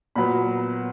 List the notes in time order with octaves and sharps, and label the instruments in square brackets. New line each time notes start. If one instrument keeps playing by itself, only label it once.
[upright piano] A#2 F#3 B3 B5